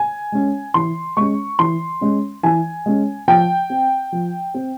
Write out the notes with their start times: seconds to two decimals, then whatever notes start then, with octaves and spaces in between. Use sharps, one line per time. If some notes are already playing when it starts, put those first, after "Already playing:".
Already playing: G#5
0.32 G#3 C#4
0.74 E3 C6
1.17 G#3 C#4 C#6
1.59 E3 C6
2.01 G#3 C#4
2.43 E3 G#5
2.86 G#3 C#4
3.28 F3 G5
3.70 C4
4.12 F3
4.54 C4